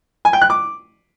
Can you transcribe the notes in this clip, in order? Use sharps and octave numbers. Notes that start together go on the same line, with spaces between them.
G#5
G5
F#6
D6